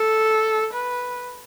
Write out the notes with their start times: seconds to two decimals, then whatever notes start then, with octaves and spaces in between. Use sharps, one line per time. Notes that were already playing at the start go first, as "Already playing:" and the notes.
Already playing: A4
0.73 B4